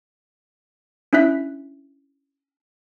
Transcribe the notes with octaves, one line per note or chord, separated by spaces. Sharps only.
C#4 D4 E4 E5 F#6 B6